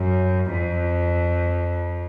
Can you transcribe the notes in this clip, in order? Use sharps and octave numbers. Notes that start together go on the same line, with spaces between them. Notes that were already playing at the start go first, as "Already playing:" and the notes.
Already playing: F#2
F2